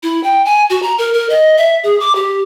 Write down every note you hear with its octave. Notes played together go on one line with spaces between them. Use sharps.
E4
G5
G#5
F#4
A#5
A#4
A#4
D#5
E5
G#4
D6
G4